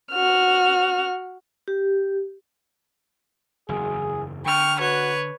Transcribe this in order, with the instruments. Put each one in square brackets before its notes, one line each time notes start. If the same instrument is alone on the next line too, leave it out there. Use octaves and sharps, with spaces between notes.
[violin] F#4 F6
[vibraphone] G4
[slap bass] F#1 E2 [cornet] G#4
[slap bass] D3 [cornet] G5 [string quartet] C#6 F6
[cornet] F#4 [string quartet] B4 C#5